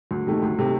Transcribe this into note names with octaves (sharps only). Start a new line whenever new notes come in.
D2
C3 D#3 A3
D2
C3 D#3 A3